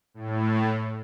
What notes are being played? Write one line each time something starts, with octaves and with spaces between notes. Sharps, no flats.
A2